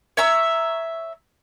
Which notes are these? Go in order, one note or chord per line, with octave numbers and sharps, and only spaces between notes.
C#5 E5 A#5 E6